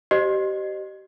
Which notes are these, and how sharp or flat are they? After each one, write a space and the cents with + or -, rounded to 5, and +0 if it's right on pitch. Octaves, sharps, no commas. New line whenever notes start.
G4 -30 C5 +0 D#5 -30